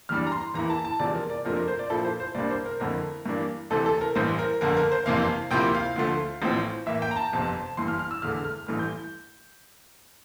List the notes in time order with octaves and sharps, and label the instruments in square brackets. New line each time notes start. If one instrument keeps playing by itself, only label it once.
[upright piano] E2 E3 G3 D4 F6
A#5
C6
E2 E3 A#3 E4 A#5
A5
A5
E1 E2 C3 F3 D5
A#4
D5
F2 C3 F3 A3 D4 A#4
A#4
C5
D5
A#1 A#2 F3 A#3 E4 A4
C5
C5
C2 C3 G3 A#3 D4 D5
C5
A#4
F2 D3 A3 C4 E4 A#4
G2 E3 A#3 D4
D2 C3 E3 A3 A4
A4
A#4
A1 G2 E3 C5
A#4
G1 F2 D3 A#4
A#4
C5
G1 F2 C3 E3 A#3 F5
D2 C3 F3 A#3 E4 G5
F5
D2 D3 F3 A3
A1 A2 F3 C4
A2 E3 A#3 E5
G5
A#5
A5
G1 F2 C3
G1 G2 E3 C6
F6
F6
E6
E1 E2 D3 A3 F6
F6
A1 G2 E3 A3 F6
G6